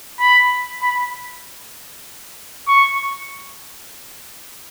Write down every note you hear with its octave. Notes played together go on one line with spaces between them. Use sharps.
B5
B5
C#6